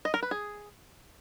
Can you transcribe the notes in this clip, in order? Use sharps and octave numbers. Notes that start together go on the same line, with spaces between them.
D#5
A#4
B4
G#4